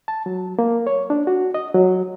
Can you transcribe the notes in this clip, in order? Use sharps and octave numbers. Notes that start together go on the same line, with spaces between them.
A5
F#3
A#3
C#5
D4
F#4
D#5
F#3